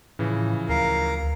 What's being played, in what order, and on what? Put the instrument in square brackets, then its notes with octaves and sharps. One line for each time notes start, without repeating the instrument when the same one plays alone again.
[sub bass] A2 [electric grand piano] C#3 E3 F3
[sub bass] D2 [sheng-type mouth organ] A#4 F5